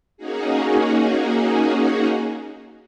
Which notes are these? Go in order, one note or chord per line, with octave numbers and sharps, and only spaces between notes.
A#3 C#4 D#4 F#4 G#4